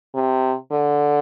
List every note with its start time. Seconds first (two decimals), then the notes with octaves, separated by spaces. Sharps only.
0.15 C3
0.72 D3